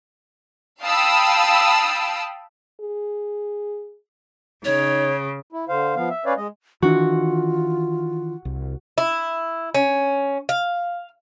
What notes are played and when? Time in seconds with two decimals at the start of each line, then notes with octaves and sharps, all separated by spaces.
0.82 F5 G5 A5 B5 D#6 E6
2.80 G#4
4.65 C#3 D#4 C#5
5.53 E4
5.69 D3 C5 F5
5.96 F3 B3 F5
6.10 E5
6.26 C#4 B4 C#5 D5 F5
6.37 G#3 D#5
6.82 D#3 E3 D4 F4 F#4
8.45 C2
8.98 E4
9.74 C#4
10.49 F5